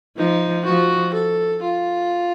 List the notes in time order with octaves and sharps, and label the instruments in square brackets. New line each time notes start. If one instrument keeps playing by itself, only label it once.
[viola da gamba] F3 [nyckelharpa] D#4
[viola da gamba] F3 [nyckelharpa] F#4
[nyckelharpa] A4
F4